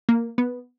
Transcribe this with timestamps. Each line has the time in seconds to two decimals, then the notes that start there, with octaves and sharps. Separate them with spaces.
0.09 A#3
0.38 B3